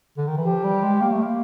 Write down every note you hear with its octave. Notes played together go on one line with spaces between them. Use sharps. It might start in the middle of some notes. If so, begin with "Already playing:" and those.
D3
D#3
E3
F3 G4
G3
G#3
A#3
A3
A#3